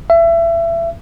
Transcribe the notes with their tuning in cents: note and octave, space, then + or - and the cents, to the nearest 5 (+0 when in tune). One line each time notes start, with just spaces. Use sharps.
E5 +25